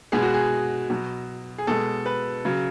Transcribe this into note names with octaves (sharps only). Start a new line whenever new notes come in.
B2 G#3 G#4
F#4
G#4
B2 F#3
G#4
B2 G#3 A4
B4
C#3 F#3